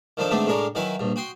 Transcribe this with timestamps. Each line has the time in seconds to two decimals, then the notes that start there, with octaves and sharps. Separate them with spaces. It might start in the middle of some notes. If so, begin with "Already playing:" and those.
0.17 D#3 F3 D4 D#4 A4
0.31 G#2 D3 A3 B3 C4 D4
0.47 A2 G#3 D4 A#4 C#5
0.75 D#3 F#3 E4 B4 G#5
0.99 A#1 G2
1.16 F#4 G5 C6 D#6